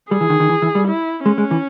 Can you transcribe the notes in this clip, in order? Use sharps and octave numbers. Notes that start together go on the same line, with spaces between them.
G3 G#4
E3
D#3
D#3
E3
E3
G3
E4
G#3 C#4
G#3
E3